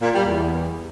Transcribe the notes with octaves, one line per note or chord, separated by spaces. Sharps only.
A#2
G3
E2